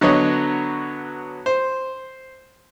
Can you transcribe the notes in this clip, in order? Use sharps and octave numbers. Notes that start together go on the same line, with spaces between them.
D3 F#3 B3 C#5 D#5
C5